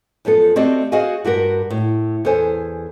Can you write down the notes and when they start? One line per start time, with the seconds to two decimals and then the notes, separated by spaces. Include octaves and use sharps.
0.25 F#2 F3 B3 A4
0.56 A3 C4 F#4 G4 D5 D#5
0.92 F#4 G#4 C5 D#5 F5 G#5
1.25 G2 F#4 G4 A#4
1.70 A2
2.25 E2 A4 C5 G#5